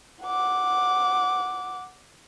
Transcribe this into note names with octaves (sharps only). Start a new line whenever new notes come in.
F#5 D6